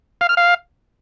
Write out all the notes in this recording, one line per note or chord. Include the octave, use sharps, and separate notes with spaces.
F5
F6
F5